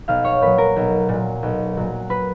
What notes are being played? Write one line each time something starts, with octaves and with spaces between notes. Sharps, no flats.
B1 F5
C#5
A#2 F#3 B4
A#4
B1
A#2 F#3
B1
A#2 F#3
B4